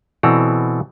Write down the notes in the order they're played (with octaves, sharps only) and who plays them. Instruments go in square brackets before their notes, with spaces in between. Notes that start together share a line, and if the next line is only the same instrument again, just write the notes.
[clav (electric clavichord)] B2 E3 C4 A4 D5 A#5